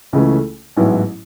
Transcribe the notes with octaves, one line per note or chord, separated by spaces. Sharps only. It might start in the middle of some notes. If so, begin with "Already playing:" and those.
C#2 C#3 E3 A3 C#4
A1 G#2 F#3 B3 E4